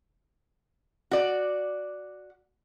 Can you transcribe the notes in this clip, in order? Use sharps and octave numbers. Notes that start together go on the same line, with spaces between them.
F#4 D5